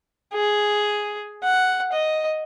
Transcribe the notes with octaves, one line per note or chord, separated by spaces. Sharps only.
G#4
F#5
D#5